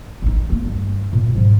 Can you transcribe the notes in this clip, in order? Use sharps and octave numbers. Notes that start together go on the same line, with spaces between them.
A1 D#4
A3 A#3
G2
A#2
G#2 F3